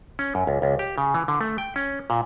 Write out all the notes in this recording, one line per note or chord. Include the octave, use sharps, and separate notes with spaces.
C#4
F#2
C#2
C#2
G4
C#3
E3
D3
A3
G5
C#4
A#2